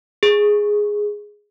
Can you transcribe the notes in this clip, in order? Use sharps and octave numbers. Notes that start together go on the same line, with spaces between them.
G#4